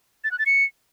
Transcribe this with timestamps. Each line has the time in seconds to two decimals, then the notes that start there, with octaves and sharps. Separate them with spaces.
0.24 A6
0.31 F#6
0.39 A6
0.46 C#7